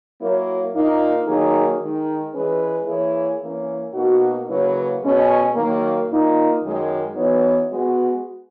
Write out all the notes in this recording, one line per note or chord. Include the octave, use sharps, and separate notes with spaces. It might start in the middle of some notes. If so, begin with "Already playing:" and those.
F#3 A#3 E4 A#4 C#5
A#2 A#3 D#4
D#3 F#3 A#3 D#4 G#4
D#3 G#3 D#4
E3 G#3 C#4 G#4 B4
E3 A#3 E4 G#4 C#5
E3 A#3 C#4
B2 A#3 D#4 F#4
C#3 F#3 A#3 E4 B4
B2 G#3 C#4
D#3 F#3 A#3
A#2 A#3 D#4
F#2 D#3 G#3
E3 B3 D#4 F#4 C#5
G#3 B3 F#4